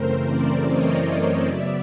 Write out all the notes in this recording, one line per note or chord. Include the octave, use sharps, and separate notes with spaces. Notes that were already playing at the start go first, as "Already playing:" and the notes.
Already playing: F#2 C#3 E3 A3 C4 A#4 C5
C5 D5
C#5 D#5
C#3 F#3 B3 D5 E5